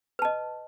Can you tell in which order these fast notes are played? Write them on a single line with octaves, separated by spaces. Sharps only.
B4 A5 D#5